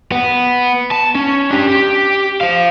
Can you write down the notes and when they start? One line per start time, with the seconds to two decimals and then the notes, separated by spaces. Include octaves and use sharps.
0.12 B3
0.91 A5
1.15 C#4
1.51 D4 G4
1.68 G4
2.41 C5 F5